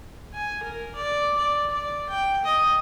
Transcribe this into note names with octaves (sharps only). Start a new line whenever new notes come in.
G#5
A#4
D5
D5
D5
G5
D#5